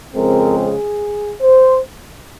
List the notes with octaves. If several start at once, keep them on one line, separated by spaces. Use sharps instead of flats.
F2 C#3 G#3 C4 A#4
G#4
C5